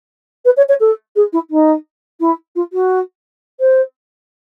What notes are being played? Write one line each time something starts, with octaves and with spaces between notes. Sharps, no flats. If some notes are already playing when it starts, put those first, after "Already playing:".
B4
C#5
C#5
A4
G#4
E4
D#4
E4
F4
F#4
C5